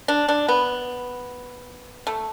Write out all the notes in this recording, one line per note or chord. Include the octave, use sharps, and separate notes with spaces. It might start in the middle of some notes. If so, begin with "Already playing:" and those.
D4
D4
B3
A3